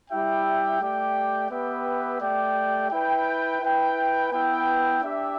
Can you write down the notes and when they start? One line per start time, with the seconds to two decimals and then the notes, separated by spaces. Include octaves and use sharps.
0.10 G3 E4 G4 E5 G5
0.80 A3 G4 D5 G5
1.50 B3 G4 B4 E5 G5
2.21 A3 G4 D5 G5
2.91 E4 B4 G5
3.61 E4 B4 G5
4.31 B3 E4 B4 G5
5.02 D4 G4 E5 G5